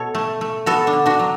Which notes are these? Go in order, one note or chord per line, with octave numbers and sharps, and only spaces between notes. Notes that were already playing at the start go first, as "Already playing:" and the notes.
Already playing: B2 A4 C#5
A3
A3
B3 F#4 A4
D4
D3
D4 F#4
F#3